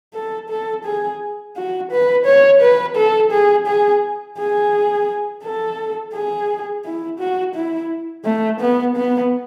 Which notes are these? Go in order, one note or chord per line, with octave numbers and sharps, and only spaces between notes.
A4
A4
G#4
F#4
B4
C#5
B4
A4
G#4
G#4
G#4
A4
G#4
E4
F#4
E4
A3
B3
B3